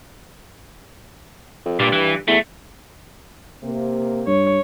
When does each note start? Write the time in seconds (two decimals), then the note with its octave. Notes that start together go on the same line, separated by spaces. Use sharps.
1.66 F2
1.80 G2 A#2
1.92 E3
2.28 E2 A3
3.64 C3 A#3
4.27 G2 C#5